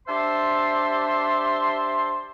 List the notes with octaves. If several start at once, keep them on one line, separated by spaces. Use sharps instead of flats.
D4 G4 C5 E5 A5 C6